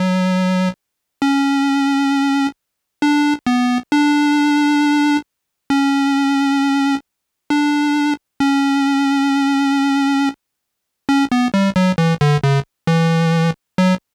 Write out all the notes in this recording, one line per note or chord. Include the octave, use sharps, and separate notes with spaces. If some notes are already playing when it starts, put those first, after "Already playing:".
Already playing: F#3
C#4
D4
B3
D4
C#4
D4
C#4
C#4
B3
G3
F#3
E3
D3
C#3
E3
F#3